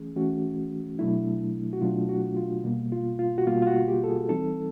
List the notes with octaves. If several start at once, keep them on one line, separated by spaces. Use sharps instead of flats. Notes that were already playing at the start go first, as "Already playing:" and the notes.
Already playing: E3 A3 C#4 G#4
E3 A3 C#4 F#4
B2 F#3 A3 D4 E4
F#4
B2 F#3 A3 D4 F4
F#4
F4
B2 G3 A#3
F4
F4
F#4
B2 G3 A#3 F4
F4
F#4
G4
A4
G#4
E3 G3 C4 D#4 A4